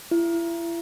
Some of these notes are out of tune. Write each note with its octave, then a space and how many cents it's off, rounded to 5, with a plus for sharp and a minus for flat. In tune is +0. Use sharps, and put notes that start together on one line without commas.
E4 +35